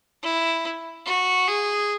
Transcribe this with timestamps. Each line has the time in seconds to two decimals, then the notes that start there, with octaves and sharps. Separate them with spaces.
0.23 E4
1.06 F#4
1.47 G#4